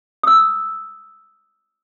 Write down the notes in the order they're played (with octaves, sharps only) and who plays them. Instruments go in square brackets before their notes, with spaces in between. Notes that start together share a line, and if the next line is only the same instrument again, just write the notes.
[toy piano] D#6 E6